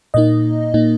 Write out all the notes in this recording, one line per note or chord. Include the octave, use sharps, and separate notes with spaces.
A#2 A#3 D#4 D#5
A#2 A#3 D#4